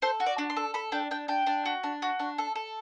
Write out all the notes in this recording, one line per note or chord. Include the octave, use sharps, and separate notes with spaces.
A4 C5
F#4
D5
D4
C6
A4
A4 B5
D4 G5
D4 G5
D4 G5
D4
F#4
D4
F#4
D4
A4
A4